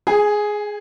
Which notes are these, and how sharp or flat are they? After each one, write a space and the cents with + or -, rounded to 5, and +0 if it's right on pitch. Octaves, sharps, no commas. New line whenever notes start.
G#4 +5 G#5 -30